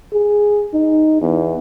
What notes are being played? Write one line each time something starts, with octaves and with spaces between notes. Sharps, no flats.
G#4
D#4
E2